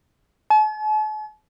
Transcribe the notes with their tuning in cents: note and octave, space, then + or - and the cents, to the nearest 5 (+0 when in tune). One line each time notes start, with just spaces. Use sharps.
A5 -45